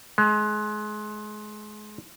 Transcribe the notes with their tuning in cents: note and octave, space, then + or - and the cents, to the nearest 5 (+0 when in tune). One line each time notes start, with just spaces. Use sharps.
G#3 +30